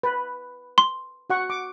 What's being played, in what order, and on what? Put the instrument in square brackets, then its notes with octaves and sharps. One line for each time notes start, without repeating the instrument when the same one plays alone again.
[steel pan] B4
[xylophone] C6
[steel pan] F#4 F#5 C#6
D6